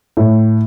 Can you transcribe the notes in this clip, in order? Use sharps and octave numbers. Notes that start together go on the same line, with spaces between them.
A2